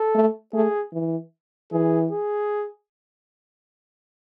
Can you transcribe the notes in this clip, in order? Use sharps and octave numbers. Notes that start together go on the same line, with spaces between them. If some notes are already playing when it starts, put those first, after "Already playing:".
Already playing: A4
A3
A3 G#4
E3
E3 G#4
G#4